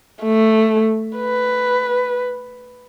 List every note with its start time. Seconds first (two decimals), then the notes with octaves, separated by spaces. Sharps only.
0.24 A3
1.18 B4